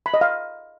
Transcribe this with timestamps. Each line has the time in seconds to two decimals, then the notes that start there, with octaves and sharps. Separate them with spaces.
0.06 B5
0.14 D#5
0.21 F5